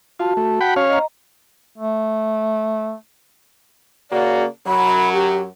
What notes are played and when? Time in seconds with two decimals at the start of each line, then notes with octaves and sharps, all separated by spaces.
0.20 F4 F#4 A5
0.37 A3
0.61 F#5 G5 B5
0.76 C#4 C#5 F5
0.89 D#5 A#5
1.78 A3
4.11 C#3 A#3 F#4 D5
4.67 F#2 F#3 B5
5.13 G4